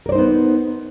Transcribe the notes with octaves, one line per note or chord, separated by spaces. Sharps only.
B3 D#4 A#4 C5 D5